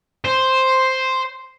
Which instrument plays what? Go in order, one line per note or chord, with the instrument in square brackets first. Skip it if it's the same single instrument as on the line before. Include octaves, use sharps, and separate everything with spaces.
[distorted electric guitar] C5